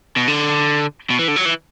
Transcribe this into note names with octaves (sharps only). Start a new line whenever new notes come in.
B2
D3
B2
E3
D3
F#3
E3